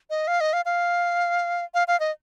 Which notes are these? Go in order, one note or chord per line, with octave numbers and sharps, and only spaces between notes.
D#5
F5
D#5
F5
F5
F5
F5
D#5